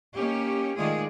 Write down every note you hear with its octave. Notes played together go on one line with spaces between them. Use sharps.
A#3 C#4 D#4 G4
D#3 G#3 A3 F4 G#4 D5